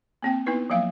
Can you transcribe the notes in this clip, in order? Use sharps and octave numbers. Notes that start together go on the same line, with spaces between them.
A#3 C4 G5
B3 D#4 E4 B4
F3 F#3 A#3 E5 F5